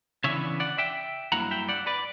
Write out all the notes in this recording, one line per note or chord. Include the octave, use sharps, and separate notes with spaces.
C#3 E3 B3 D4 C#5 E5
D5 F#5
E5 G5
G2 F#3 A#3 E4 F#5 A#5
E5 G5
D5 F#5
B4 D5